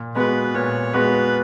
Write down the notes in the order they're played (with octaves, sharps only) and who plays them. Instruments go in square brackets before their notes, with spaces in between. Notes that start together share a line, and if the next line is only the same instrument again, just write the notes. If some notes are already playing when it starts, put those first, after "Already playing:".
Already playing: [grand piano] A#2
[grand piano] G#3 B3 F#4 [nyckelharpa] B4
[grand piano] A#2 [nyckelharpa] C#5
[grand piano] G#3 B3 F#4 [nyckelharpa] B4